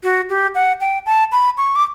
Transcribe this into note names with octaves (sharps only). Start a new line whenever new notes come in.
F#4
G4
F#5
G5
A5
B5
C#6
D6